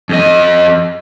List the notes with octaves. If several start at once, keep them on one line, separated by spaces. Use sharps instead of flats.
F2 D#5